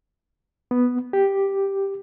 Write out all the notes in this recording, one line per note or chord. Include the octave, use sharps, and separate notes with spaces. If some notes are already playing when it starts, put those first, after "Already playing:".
B3
G4